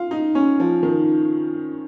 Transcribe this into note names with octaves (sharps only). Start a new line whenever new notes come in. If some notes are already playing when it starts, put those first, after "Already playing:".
Already playing: F4
D#4
C#4
F3
D#3